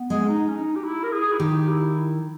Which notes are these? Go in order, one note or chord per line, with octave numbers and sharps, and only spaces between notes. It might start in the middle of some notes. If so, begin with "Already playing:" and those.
Already playing: B3
G#3
C#4
D#4
C#4
D#4
G4
E4
A#4
G#4
E4
D#3 G4
E4